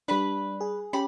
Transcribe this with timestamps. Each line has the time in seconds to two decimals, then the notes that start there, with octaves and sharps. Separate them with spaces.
0.08 G3 D4 B4 B5
0.61 G#4
0.93 C#4 G4 B5